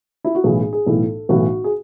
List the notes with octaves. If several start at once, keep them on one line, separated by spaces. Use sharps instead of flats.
E4
F#4
B1 A2 E3 G#4
G#4
G#4
B1 A2 E3 A4
B1 A2 E3 F#4
G#4